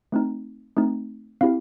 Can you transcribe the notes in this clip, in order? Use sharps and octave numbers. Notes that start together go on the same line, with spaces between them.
A3 C4 D#4
A3 C4 D#4
C4 E4 G4 F5